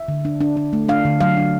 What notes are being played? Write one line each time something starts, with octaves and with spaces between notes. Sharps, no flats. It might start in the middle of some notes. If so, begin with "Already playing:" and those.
Already playing: E5
D3
D4
D4
D4
A3
D4 F5
D3
F#3 F5
D4